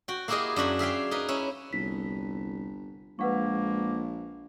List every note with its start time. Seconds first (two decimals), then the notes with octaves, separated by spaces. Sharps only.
0.08 F#4 G5
0.28 A#3 E4 G4 G#4 A#4 D#5
0.56 F#2 D4 F#4 B5
0.79 G#4 E5 F5 G5
1.11 D#4 A#4 B4
1.29 C#4 E4
1.73 G1 C2 B6
3.19 A#1 G#3 A#3 B4 F#5 C#6